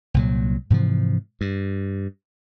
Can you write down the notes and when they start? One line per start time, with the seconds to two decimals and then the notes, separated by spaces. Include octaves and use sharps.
0.14 C2 A#2 F#3
0.70 G#2 C3 E3 F3
1.41 G2